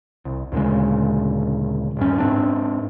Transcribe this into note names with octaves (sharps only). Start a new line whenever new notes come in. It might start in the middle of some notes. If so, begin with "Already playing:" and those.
C2
D2 A#2 C#3 G#3
D#1 G2 C#4
G#2 C4 D4